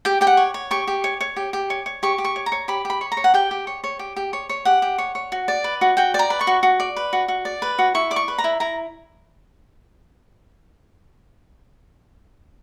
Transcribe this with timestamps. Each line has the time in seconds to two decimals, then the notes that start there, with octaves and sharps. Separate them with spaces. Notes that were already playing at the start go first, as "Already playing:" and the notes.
0.05 G4 G5
0.21 G4 G5
0.27 F#5
0.37 C#5
0.54 C#5
0.71 G4 C#6
0.87 G4
1.04 C#5
1.21 C#5
1.36 G4
1.53 G4
1.70 C#5
1.86 C#5
2.03 G4 C#6
2.18 G4
2.25 C#6
2.36 C#5
2.46 A#5
2.52 C#5
2.68 G4 B5
2.85 G4 B5
3.01 C#5
3.12 A#5
3.17 C#5
3.24 F#5
3.34 G4 G5
3.51 G4
3.67 C#5
3.84 C#5
3.99 G4
4.16 G4
4.33 C#5
4.49 C#5
4.65 G4 F#5
4.82 G4
4.98 C#5
5.15 C#5
5.32 F#4
5.48 D5
5.64 B4
5.81 F#4
5.97 F#4 G5
6.14 D5 A#5
6.30 B4
6.41 C#6
6.47 F#4
6.63 F#4
6.80 D5
6.96 B4
7.13 F#4
7.28 F#4
7.45 D5
7.62 B4
7.79 F#4
7.95 E4 C#6
8.11 D5 D6
8.16 C#6
8.28 B4
8.38 A#5
8.44 E4
8.60 E4 A#5